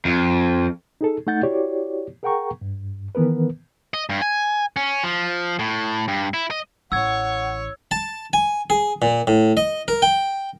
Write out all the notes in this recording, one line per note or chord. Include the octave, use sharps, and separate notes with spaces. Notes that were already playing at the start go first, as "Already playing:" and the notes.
F2
D#4 G#4 A4
A3 D#4 F#5 G6 A6
E4 F#4 G4 C#5 D5
G#4 A#4 F#5 G5 A#5 C#6
G2
D#3 E3 B3 A#4 B4
D#5
G2
G#5
C#4
F3
A2
G2
E4
D#5
A1 C#5 F#5 C#6 E6 G#6
A5
G#5
G#4
A#2
A2
D#5
A#4
G5